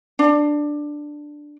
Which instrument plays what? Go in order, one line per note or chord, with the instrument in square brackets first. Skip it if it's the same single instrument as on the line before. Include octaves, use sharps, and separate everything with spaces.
[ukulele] D4